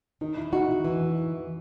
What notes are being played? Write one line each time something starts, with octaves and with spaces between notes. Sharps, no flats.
D#3 D#4
E4
D#4 F#4
E4
E3 D#4